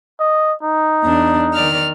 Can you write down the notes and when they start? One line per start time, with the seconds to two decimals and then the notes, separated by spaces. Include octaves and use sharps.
0.20 D#5
0.63 D#4
1.04 E2 D4
1.54 D#3 D5 F6